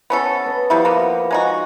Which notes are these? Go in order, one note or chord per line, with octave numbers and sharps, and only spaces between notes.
B3 C#4 A4
B4 D#5
F3 G3 B3 E4
A#3 B3
G#3 D#4 F#4